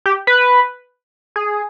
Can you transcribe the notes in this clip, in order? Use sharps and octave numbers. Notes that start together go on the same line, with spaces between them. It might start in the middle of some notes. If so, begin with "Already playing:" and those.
G4
B4
G#4